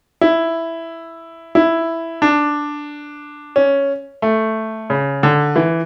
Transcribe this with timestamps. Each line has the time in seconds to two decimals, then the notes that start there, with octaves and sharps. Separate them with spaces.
0.21 E4
1.55 E4
2.22 D4
3.56 C#4
4.22 A3
4.90 C#3
5.23 D3
5.56 E3